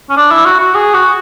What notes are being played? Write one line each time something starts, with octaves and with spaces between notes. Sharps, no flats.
C#4
D4
E4
F#4
F#4
G#4
F#4